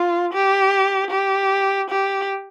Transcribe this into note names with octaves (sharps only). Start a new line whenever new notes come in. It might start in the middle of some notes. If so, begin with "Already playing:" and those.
Already playing: F4
G4
G4
G4